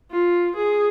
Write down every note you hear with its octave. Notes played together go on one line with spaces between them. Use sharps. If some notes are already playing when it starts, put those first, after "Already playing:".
F4
G#4